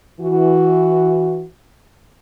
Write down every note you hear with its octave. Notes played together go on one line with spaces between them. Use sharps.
E3 F#4